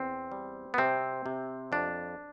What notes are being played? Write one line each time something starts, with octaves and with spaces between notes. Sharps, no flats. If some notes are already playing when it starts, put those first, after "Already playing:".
Already playing: E2 C4
G3
B3
C3 C4
C3
F2 D4